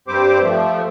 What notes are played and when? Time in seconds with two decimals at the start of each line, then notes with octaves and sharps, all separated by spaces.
0.08 G2 G3 C4 G4 C5 D6
0.43 F3 A3